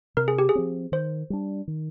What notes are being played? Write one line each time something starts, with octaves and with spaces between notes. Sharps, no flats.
C3 A#4
G#4
G4
G#4
F3 C4
D#3 C5
G3 D4
D#3